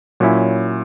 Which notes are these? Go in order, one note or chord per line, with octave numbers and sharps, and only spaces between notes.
A#2 F#3 C#4 E4